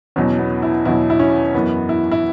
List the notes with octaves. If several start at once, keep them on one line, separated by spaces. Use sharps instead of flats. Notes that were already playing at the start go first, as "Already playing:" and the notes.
E2 B2 F#3 C#4
B3
E4
E2 B2 F#3 E4
E4
C#4
F#2 E3 B3
E4
E4